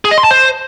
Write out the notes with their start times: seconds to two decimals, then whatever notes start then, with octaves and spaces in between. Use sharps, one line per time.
0.05 G#4
0.11 D#5
0.18 C6
0.24 A5
0.31 C5